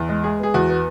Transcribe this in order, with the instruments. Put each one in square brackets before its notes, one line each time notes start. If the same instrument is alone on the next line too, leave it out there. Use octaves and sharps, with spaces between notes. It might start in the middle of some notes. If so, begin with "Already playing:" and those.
Already playing: [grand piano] E2
G#3
G#3 G#4
B3 G#4
E2 F#4
B3